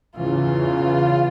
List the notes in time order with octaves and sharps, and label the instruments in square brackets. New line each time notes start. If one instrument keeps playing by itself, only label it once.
[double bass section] E2 C#3 E3 [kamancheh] F4